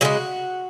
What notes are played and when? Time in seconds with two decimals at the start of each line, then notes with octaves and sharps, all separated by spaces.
0.01 C#3 F#3 G#3 F#4